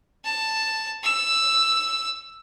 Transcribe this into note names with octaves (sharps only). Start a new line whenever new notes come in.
A5
E6